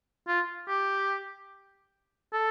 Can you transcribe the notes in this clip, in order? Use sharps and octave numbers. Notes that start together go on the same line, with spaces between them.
F4
G4
A4